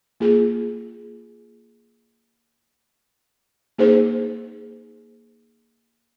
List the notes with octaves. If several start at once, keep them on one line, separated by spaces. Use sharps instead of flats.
A#3 F4 G#4
A#3 D#4 G#4 C5